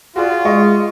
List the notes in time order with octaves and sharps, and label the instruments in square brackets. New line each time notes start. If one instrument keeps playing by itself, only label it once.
[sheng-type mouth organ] F4 [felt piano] F#4 G#4 D5
[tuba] G#3 [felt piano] D#5 C#6